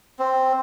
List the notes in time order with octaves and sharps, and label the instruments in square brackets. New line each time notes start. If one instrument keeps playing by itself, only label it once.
[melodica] C4